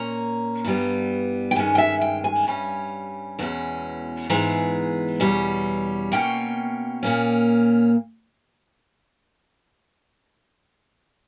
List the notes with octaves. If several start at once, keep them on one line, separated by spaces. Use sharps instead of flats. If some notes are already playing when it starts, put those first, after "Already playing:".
Already playing: A#2 A#3 C#4 A#5
G2 E3 G3 B3
G5
G2 D#3 G#3 C#4 G#5
G5
E5
G5
G#5
G2 G3 C#4
E2 B2 G#3 C#4
G#2 E3 G#3 B3 A#5
E2 B2 G3 C#4
B2 A#3 C#4 G5
A#2 A#3 C#4